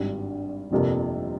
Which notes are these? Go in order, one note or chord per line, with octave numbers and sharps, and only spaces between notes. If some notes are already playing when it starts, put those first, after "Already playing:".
Already playing: G#1 G2 G3
G1 F2 C3 G3 A#3